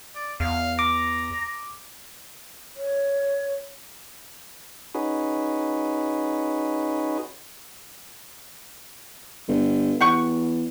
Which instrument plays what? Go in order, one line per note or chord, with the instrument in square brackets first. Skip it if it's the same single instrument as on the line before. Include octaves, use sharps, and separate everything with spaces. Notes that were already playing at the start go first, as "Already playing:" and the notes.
[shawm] D5
[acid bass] E2 [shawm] F5
[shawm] A#5 [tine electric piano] D6
[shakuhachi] C#5
[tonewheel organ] C#4 D#4 F#4 G#4 B4
[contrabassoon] G1
[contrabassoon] E2 [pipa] G4 F#5 C#6